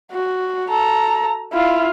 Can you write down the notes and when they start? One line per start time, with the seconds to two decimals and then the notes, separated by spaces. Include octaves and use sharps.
0.11 F#4
0.70 A4 A#5
1.53 E4 F4 F5